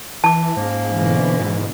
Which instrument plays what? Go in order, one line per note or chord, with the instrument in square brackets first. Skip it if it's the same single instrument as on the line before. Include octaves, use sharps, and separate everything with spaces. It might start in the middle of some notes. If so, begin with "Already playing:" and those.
[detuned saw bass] E3 [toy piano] A5 D6
[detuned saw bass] G#2 [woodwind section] F3 A#3 C#4
[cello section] B2 D3 E3
[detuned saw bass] G#2